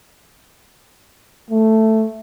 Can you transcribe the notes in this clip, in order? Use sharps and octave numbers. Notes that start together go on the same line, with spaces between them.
A3